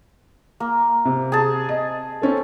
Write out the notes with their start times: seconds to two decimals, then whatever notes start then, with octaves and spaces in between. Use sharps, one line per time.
0.60 A#3
1.05 C3
1.32 G#4 A5
1.69 D#5
2.22 C4 C#4 A4